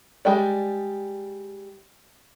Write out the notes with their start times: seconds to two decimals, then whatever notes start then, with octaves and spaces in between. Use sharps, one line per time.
0.25 G3 G#3 G4 D5